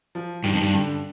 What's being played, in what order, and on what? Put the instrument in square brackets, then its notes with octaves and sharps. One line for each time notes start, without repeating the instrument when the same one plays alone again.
[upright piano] F3
[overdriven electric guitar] G2 [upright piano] D#3
[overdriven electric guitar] F2
G2
[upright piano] D3